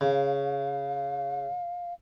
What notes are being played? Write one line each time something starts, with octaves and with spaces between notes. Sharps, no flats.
C#3 F5